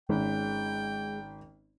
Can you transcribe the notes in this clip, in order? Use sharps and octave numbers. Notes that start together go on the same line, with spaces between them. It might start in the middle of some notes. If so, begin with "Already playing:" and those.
G#1 G#3 C#4 G5